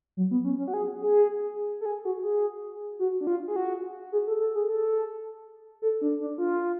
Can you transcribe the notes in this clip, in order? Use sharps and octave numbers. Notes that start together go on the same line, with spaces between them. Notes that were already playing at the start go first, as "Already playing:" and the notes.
F#3
B3
C#4
C#4
F#4
G#4
G#4
A4
G#4
F#4
G#4
F#4
D4
F4
G#4
F#4
G#4
A4
A4
G#4
A4
A4
D4
D4
F4